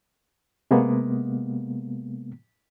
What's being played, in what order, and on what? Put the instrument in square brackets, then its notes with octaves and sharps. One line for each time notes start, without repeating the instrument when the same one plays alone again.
[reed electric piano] C3 G#3 A#3 B3